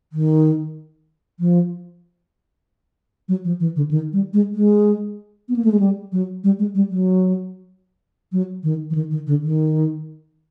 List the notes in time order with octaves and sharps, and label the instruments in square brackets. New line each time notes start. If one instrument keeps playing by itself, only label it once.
[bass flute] D#3
F3
F#3
F3
E3
D3
D#3
G3
G#3
G#3
B3
A#3
A3
G#3
G3
F#3
G3
G#3
G3
F#3
F#3
D#3
E3
D#3
D#3
D3
D#3